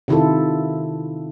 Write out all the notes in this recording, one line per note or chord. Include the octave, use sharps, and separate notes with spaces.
C3 D#3 E4 F4 A4